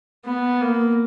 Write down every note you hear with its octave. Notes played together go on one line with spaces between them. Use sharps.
B3
A#3